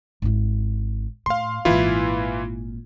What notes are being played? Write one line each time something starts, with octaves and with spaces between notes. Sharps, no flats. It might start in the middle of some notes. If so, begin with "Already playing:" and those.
G#1 E4
A2 F5 C6
G#1 A#2 E3 E4 F4